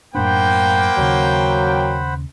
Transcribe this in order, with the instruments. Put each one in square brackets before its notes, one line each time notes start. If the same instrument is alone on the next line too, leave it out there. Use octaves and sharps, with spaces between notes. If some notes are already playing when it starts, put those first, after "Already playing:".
[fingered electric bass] F#2 A2 D4 [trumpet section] A#3 G5 [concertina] C5 F#5 B5
[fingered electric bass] D#2 C#3 [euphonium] F#3